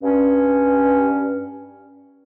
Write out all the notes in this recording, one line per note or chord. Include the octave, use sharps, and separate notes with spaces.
G2 C#4